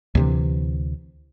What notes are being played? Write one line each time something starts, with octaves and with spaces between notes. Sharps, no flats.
D2 C3 E3